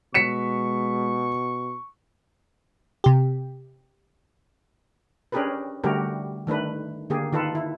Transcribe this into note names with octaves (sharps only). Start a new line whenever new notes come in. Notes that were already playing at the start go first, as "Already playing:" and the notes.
B2 G#3 C#6 B6 C#7 E7
C3 G4
C#4 D4 G4 G#4 A#4 B4
D3 G3 A3 F#4 G4 A#4
D#3 A3 D4 B4
D3 A#3 G4 G#4
D#3 F4 A4 B4
E4